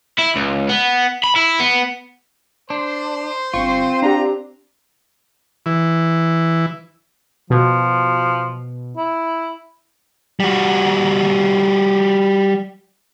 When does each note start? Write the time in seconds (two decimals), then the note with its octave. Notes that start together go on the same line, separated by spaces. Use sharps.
0.19 E4
0.36 C#2
0.69 B3
1.24 B5
1.36 E4
1.60 B3
2.70 D4 C5
3.54 G1 C4 F4 C#6
4.02 D4 G4 A#5
5.66 E3
7.50 B2 F3
8.97 E4
10.40 G3 F#4